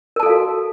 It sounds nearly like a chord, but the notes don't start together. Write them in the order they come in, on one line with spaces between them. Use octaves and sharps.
A#4 A5 A4 F5 F#4